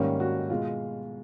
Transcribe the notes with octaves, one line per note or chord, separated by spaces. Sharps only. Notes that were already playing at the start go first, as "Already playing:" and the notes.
Already playing: G#2 D#3 G3 A#3 C#4
F#4
B2 G#3 F4